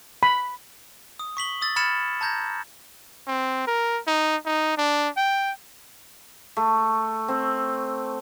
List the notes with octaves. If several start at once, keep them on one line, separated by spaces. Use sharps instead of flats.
B5
D#6
C#6 B6 F#7 G7
D#6 E6 A6
B5 F6 G#6 A6 C#7 E7
A5 A#5 G6 G#6 A#6
C4
A#4
D#4
D#4
D4
G5
A3
C4